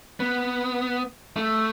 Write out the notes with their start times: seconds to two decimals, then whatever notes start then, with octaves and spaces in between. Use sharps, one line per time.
0.20 B3
1.37 A3